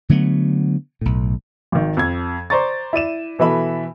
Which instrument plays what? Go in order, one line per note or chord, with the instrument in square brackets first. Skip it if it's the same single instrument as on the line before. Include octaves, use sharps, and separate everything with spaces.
[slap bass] D3 F#3 A3 B3
B1 A2
[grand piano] G#1 D#3
F2 G#6
C5 D5 A#5 C#6 A6
E4 D5 D#7 E7
B2 E3 A4 E5 B5